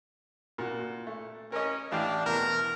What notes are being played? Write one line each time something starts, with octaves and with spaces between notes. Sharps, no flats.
A#2 F#4
A3
C#4 A#4 D#5
A1 D4 F5 G5
E2 B2 A#4